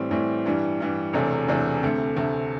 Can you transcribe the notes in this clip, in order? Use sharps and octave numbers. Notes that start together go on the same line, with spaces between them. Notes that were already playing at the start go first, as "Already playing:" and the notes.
Already playing: A2 E3 G3 C4
A2 E3 G3 C4
G2 E3 G3
G2 E3 G3
E1 E2 C3 A3 D4
E1 E2 C3 A3 D4
D2 C3 A3
D2 C3 A3